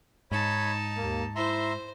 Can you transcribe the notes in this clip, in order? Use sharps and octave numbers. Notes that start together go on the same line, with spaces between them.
G#2 D#4 C#5 A5 B5
D#2 A#3
E4 C5 E5 A#5 C6